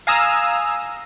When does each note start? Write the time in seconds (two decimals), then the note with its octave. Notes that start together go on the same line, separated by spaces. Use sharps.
0.07 F5 G#5 A#5 D#6 E6